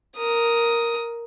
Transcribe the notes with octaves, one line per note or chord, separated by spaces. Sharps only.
A#4 D#6